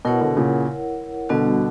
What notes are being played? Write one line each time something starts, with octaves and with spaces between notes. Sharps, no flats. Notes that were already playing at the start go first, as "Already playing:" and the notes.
B2 E4 A#4 C#5 F#5
B2 D3
A#2 C#3
B2 D3 G3 B3 D4 F#4